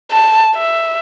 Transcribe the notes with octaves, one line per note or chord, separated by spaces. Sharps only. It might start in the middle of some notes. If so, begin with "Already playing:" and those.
A5
E5